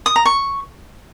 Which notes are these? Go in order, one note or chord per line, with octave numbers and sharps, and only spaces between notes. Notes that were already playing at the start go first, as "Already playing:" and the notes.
D#6
A#5
C#6